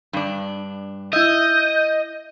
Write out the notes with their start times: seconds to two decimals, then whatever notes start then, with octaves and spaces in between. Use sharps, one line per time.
0.13 G2 D4
1.13 E4 D#5 E5 G6